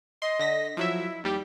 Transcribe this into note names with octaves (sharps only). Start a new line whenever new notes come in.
D#5 C6
D3 A#6 B6
F3 F#3 E4 E5
D#2 G3 G4